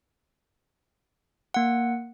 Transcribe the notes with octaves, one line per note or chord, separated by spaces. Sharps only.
A#3 F#5